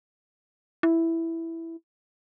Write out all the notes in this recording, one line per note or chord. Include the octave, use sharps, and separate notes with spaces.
E4